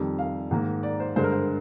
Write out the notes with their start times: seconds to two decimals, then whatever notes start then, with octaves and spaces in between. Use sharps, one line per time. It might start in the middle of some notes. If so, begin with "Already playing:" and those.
Already playing: F2 D#3 G3
0.19 F5
0.51 G#2 D#3 A#3
0.83 D5
1.00 C5
1.16 G2 D3 G#3 C5
1.24 A#4
1.32 C5